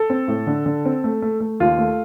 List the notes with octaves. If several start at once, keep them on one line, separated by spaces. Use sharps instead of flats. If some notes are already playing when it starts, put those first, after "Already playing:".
Already playing: A4
C4
A2
D3
D3
C4
A3
A3
A3
D#2 F4
A3